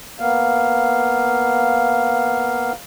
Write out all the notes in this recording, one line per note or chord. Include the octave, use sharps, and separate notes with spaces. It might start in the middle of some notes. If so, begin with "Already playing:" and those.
A#3 B3 F5